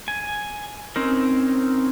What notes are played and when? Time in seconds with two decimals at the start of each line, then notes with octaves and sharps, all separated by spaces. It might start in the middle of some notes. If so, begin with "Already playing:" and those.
0.08 G#5
0.96 C4 C#4 D#4 A#4